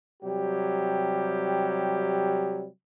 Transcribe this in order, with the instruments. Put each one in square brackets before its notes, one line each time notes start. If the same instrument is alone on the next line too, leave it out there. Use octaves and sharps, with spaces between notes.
[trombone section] C3 F#3 G3 G4